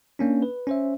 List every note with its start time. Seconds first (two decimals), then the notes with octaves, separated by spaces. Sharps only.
0.19 A#3 C#4 D4
0.42 B4
0.67 C#4 C5 E5